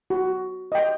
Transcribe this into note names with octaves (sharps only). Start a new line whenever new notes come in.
F#4
D#5 G5